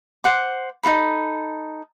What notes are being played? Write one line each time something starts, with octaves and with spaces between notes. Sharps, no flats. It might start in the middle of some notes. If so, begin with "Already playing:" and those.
C5 F#5 D6
D#4 F4 A4 B5